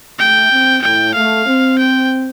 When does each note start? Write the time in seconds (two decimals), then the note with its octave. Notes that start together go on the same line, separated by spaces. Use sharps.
0.19 A3 G5
0.51 C4
0.83 A2 G5
1.15 A3 F5
1.47 C4
1.79 G5